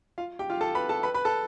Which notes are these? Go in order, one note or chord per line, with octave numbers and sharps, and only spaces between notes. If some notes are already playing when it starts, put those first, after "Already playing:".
F4 F5
G4 G5
F4 F5
A4 A5
B4 B5
A4 A5
B4 B5
B4 B5
A4 A5